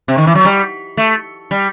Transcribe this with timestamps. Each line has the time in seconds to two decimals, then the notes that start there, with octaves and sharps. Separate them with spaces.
0.08 C3
0.17 D#3
0.27 E3
0.35 F#3
0.45 G3
0.97 A3
1.51 G3